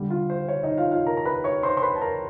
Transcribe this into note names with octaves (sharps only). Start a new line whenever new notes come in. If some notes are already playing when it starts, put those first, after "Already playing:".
Already playing: D3 G3
F4 F5
C5
C#5
D#4 D#5
F4 F5
F4 F5
A#4 A#5
A#5
B4 B5
C#5 C#6
C5 C6
C6
B4 B5
A5
A#4 A#5